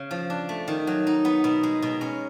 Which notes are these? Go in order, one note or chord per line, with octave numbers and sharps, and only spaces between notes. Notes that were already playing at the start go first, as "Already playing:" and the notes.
Already playing: C#3
F3
D4
A3
D#3
F#3
D#4
B3
B2
G#3
B2
C#4